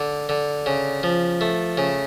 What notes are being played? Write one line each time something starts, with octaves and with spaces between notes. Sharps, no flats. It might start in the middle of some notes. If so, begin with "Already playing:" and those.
Already playing: D3
D3
C#3
F3
A3
C#3